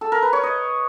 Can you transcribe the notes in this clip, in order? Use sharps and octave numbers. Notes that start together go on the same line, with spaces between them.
A4
A#4
B4
C#5
D#5